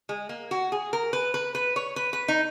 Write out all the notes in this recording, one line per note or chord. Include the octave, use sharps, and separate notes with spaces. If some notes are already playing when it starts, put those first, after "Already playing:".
G#3
A#3
F#4
G#4
A#4
B4
B4
B4
C#5
B4
B4
D#4